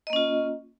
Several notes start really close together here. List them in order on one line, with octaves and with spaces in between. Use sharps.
D#5 A#3 C#4 F4